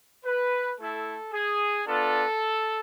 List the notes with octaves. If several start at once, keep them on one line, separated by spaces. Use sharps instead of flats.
B4
A3 E4 A4
G#4
B3 D4 F4 A4